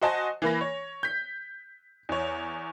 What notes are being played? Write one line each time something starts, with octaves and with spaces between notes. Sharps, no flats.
F#4 C5 D#5 G#5 A5
E3 A#3 B5 A#6
C#5
G6 B6
E2 C#5